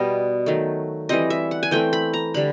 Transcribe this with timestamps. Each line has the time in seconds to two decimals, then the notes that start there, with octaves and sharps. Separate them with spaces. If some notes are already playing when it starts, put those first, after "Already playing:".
Already playing: B2 G3 B3 D#5
0.46 D#3 F#3 A3
1.09 E3 G3 C4 D#5
1.30 E5
1.51 F#5
1.63 G#5
1.71 E3 A3 C4 G5
1.93 B5
2.14 A#5
2.34 D3 G3 B5